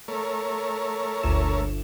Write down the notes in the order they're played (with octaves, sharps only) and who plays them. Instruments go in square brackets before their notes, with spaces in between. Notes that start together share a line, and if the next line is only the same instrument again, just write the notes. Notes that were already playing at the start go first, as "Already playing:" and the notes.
[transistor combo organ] A3 A#4 C#5
[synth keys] G1 D2 E7